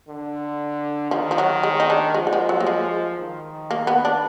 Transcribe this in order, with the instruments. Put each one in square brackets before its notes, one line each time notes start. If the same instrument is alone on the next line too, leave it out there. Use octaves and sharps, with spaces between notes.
[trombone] D3
[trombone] D#3 [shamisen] F3
[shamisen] F3
F#3
G#3
D#4
D4
[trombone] F3 [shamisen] G#3
[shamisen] F#3
G#3
F#3
A#3
G#3
[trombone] D#3
[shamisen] A#3
B3
D4